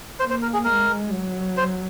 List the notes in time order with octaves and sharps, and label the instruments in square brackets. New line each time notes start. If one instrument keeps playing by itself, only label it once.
[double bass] A#3 [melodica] C5
[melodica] C5
A#4
G#4
[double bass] G#3 [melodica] A#4
[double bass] F#3
[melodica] C5